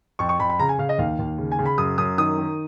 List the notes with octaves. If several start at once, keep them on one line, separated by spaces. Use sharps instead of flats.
F2 C#6
C#6
F2 B5
B5
C#3 A#5
G#5
C#3 F5
D#5
D#2 F5
D#2
C#3
G#5
C#3
B5
F#2 D#6
F#2 D#6
D#3 D#6
D#3